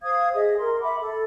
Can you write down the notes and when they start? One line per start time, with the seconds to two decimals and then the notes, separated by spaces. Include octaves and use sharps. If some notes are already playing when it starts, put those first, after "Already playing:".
0.03 C5 F5 D#6 G#6
0.33 G#4 D#5 E5 D#6
0.57 A#4 C6
0.82 E5 F#5 B5 D6
0.99 A4